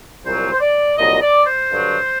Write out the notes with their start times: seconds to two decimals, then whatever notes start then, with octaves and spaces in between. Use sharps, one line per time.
0.24 C2 A#2 F#3 C5
0.52 C5
0.60 D5
0.97 C2 A#2 F#3 D#5
1.22 D5
1.46 C5
1.71 G2 D3 F#3